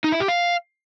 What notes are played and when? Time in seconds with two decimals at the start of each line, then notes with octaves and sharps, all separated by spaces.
0.04 D#4
0.12 E4
0.20 G4
0.28 F5